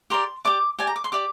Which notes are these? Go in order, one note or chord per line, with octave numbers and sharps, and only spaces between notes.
G4 A#4 D5 C6
G4 D5 D6
G4 D5 G#5
A#5
D6
C6
G4 D5 D6